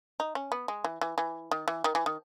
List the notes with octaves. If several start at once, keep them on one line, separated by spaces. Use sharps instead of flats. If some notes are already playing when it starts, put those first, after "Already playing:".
D#4
C#4
B3
G#3
E3
E3
E3
D#3
E3
D#3
E3
D#3